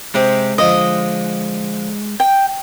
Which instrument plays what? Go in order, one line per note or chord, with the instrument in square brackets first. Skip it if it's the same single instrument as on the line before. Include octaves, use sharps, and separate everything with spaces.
[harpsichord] C3 C4 G4 [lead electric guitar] G#3
[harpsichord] D3 F3 [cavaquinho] D#5
[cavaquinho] G5